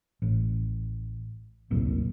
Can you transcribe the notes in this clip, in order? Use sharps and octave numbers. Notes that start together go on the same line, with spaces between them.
A1
D#1 C2 F#2 A#2